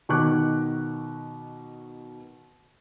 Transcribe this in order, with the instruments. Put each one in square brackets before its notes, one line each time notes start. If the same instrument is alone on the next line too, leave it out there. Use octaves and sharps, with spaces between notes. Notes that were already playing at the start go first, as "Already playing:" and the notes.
[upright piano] B2 D#3 C#6 D6 F#6